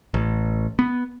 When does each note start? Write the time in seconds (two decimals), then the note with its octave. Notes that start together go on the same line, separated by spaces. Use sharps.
0.14 A1
0.79 B3